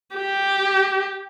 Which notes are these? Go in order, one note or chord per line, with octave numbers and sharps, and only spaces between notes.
G4